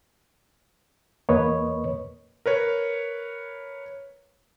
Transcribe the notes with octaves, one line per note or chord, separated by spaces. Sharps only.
E2 A#3 B4 C#5 D#5
A#4 B4 C#5